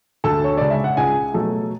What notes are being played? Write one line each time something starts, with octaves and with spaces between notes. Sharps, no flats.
D2 A4 A5
C#5
C#3 G#3 D5
E5
F#5
C#2 G#4 G#5
B2 F#3 A3 A4